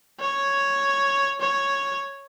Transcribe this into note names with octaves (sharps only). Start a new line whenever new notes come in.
C#5
C#5